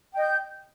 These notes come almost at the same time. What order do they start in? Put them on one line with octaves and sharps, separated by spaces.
G5 D#5 G6